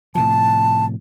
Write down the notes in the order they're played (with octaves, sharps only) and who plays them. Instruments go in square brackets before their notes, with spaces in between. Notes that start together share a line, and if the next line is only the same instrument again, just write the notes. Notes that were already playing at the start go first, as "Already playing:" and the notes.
[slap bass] A2 C3 F3 [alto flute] A5